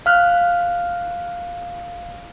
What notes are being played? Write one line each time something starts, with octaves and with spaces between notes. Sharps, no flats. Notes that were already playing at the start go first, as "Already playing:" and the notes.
F5 F6 F#6